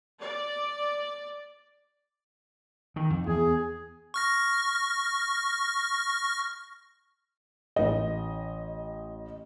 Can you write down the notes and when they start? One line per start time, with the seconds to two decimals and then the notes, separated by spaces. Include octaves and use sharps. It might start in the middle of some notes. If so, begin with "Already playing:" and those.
0.20 D5
2.96 D#3
3.10 F2
3.27 E2 G#4
4.14 C#6 F6 A#6
7.76 A1 D#5